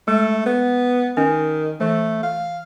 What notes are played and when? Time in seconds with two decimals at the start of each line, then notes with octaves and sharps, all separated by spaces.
0.08 G#3 A3
0.46 B3
1.17 D#3 C#4
1.81 E3 A3
2.23 F5